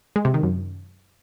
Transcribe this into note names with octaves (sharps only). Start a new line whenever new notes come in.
G#3
C3
D#3
F#2